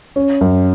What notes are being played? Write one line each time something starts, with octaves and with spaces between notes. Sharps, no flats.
C#4
F#2